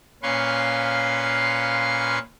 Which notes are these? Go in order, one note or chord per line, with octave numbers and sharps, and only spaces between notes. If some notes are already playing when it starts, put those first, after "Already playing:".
A#2 C#4 B4 F5 C6 C#6